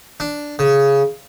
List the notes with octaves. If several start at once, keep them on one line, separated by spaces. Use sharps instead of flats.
D4
C#3